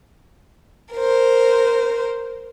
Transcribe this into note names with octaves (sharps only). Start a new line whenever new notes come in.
A#4 C5